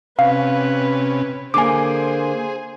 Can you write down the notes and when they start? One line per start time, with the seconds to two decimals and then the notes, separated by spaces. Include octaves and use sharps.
0.19 C3 C#4 B4 F5
1.54 D3 A#3 G#4 C5 G#5 D6